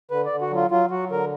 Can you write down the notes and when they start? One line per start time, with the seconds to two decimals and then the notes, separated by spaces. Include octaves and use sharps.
0.11 D3 B4
0.26 D3 D5
0.41 F#4
0.51 F#3 F4
0.71 F#3 F4
0.91 F#3 F#4
1.10 D3 A#4